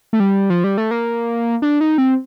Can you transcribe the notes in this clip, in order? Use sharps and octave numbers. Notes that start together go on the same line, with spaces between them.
A3
G3
F3
G3
A3
A#3
D4
D#4
C4